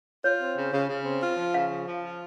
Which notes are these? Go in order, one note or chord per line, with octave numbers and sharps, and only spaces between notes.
F4 C#5
C4
C#3
C#3
C#3
C4
F4
F3
C#3 F5
F3
F3
F4